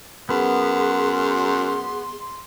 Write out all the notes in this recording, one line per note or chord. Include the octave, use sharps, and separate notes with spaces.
F#2 B3 G#4 C6